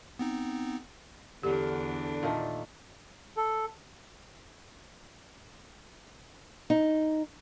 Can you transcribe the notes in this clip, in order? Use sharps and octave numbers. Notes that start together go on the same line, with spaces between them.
B3 C4 D#4
E2 D3 D4 G4
A#2 D#3 A3
A4
D#4